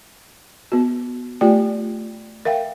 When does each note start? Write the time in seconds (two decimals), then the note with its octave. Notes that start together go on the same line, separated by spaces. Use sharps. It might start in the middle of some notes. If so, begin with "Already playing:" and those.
0.72 B3 F#4
1.41 A3 F4 G4 D5 G5
2.45 A#4 E5 F5 G5